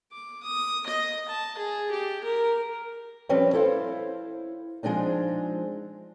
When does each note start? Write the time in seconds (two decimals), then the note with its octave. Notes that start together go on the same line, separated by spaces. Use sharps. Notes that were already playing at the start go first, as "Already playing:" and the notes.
0.12 D6
0.43 D#6
0.86 D#5
1.28 A5
1.58 G#4
1.91 G4
2.24 A#4
3.29 F3 G3 C4 C#4 B4
3.53 E4 A4 C5 F5
4.83 F3 G#3 C4 D4 D#4